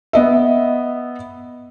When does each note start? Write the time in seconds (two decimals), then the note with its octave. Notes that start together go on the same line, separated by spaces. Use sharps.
0.13 B3 D#5 E5